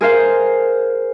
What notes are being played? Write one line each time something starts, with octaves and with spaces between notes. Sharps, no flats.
G#4 A#4 C5 F5